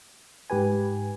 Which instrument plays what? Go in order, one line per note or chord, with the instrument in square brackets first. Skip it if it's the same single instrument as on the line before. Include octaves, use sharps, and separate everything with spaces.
[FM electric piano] G#2 G4 B4 G#5